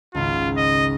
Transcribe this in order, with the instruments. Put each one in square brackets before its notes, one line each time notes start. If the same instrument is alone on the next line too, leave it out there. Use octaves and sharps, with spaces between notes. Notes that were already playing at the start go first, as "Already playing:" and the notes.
[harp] G#1 C#2 [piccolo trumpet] F4
[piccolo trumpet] D#5